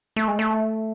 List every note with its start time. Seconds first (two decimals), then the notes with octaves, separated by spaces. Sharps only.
0.16 A3
0.28 G#3
0.39 A3